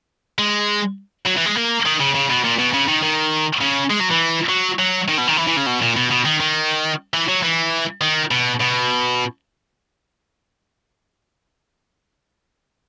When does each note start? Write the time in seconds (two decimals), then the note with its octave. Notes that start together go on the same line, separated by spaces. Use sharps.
0.39 G#3
1.26 F#3
1.37 E3
1.46 G#3
1.56 A#3
1.85 D#3
2.00 C#3
2.15 C#3
2.30 B2
2.44 A#2
2.58 B2
2.73 C#3
2.88 D#3
3.03 D#3
3.61 C#3
3.90 G#3
4.00 F#3
4.11 E3
4.49 F#3
4.79 F#3
5.08 D#3
5.18 B2
5.28 D#3
5.37 E3
5.47 E3
5.57 C#3
5.67 B2
5.82 A#2
5.96 B2
6.11 B2
6.25 D#3
6.40 D#3
7.14 E3
7.28 F#3
7.43 E3
8.01 D#3
8.31 B2
8.61 B2